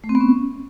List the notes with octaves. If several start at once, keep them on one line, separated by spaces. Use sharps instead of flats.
A3
C4
B3
C#4